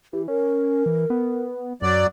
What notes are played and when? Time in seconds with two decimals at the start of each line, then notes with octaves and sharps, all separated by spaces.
0.13 E3 G4
0.28 C#4 A#4
0.86 E3
1.10 B3
1.82 F#2 F#3 D5